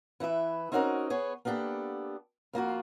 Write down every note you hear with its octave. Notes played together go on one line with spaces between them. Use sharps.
E3 E4 B4 E5
C4 C#4 D#4 F#4 A4 A#4
B3 G#4 C#5
A#3 B3 D4 G4 A4
F2 A#3 F4 F#4